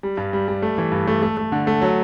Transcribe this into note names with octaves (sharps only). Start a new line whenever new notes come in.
G3
G2
G3
G3
A3
E3
G2
A3
A3
A3
D3
A3
F#3